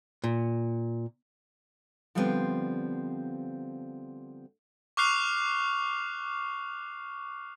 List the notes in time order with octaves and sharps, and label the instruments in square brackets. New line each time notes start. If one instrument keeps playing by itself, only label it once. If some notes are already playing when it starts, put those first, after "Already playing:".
[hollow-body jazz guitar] A#2
[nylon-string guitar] D3 F3 G3 G#3 B3 C4
[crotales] C#6 D6 F6 F#6 C7 F7